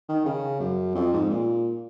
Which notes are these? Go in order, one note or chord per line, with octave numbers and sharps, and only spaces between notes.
D#3
C#3
F#2
F2
G#2
A#2